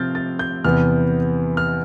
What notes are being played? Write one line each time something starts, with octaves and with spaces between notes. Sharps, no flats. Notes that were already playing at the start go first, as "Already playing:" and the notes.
Already playing: C3 F3 C4 F6 G6 A6
A6
G6
E2 C3 E3 B3 F6
F6